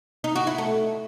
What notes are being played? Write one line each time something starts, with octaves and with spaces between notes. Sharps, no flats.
D#4
F#4
E4
A3